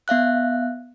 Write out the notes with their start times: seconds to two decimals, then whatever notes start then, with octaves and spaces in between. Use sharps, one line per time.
0.08 B3 E5 F5 F#6